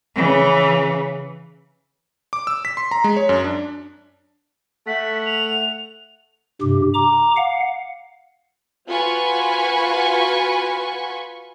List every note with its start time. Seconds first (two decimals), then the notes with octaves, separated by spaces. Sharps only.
0.15 C#3 E3
2.33 D6
2.47 E6
2.65 B6
2.77 C6
2.91 A#5
3.04 G#3
3.17 C#5
3.29 F#2
3.44 D4
4.87 A3 F#5 B6
5.26 F7
6.62 G2 C3 G4
6.94 A#5 D6
7.36 F5 F#5
8.88 F4 F#4 B4 G#5 B5 C#6